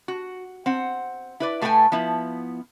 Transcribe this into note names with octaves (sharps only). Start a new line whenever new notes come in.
F#4
C4 F#5
E4 B4 D5
A2 A3 A4 B4 G5 G#5
F3 B3 E4